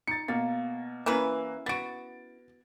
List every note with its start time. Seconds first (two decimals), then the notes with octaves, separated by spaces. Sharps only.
0.07 D#4 A6 C#7
0.28 B2 A#3 F5 A6
1.06 E3 A#3 C#4 E4 A#4 B4
1.66 B3 F#4 A6 D7